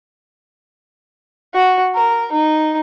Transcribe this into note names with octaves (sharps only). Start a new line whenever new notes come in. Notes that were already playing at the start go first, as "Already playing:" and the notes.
F#4
A#4
D#4